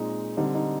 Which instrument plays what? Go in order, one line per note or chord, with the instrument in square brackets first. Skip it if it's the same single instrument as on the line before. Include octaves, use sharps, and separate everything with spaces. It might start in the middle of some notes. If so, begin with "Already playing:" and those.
Already playing: [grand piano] A#2 G#3 C4 D#4
D3 G3 C4 D#4
D#4